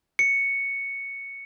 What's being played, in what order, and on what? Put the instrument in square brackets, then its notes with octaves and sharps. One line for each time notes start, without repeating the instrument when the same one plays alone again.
[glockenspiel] C#7